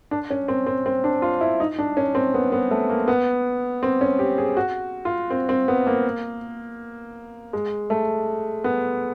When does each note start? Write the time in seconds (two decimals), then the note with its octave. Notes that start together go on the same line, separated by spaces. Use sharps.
0.11 D4
0.30 C#4
0.48 C4
0.66 C4
0.86 C4
1.04 D4
1.22 F4
1.41 E4
1.60 D#4
1.79 D4
1.97 C#4
2.15 C4
2.34 B3
2.52 B3
2.71 A3
2.90 A#3
3.08 B3
3.83 C4
4.01 C#4
4.19 G4
4.38 G#4
4.57 F#4
5.05 F4
5.30 C4
5.49 C4
5.68 B3
5.87 A#3
7.53 G#3
7.90 A3
8.64 B3